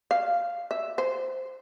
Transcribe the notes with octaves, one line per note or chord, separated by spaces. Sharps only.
F5
E5
C5